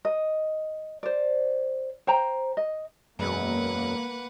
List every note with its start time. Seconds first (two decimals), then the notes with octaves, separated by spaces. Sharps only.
0.05 D#5
1.03 C5 D5
2.07 C5 G5 A#5
2.57 D#5
3.19 E1 F#2 A#3 B4 F#5